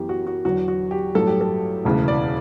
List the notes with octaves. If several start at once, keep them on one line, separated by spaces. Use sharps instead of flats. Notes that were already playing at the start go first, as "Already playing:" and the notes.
Already playing: F#2 E3 B3 G4
F#4
F#4
E2 D3 F#3 F#4
F#4
G4
A1 G2 F#3 A4
G4
A4
E1 D2 C#3 E3
D5